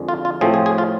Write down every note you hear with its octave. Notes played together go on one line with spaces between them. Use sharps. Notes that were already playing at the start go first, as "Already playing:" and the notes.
Already playing: F2 D3 G#3
F4
F4
A2 F3 A3 C4 G#4
G#4
G#4
F4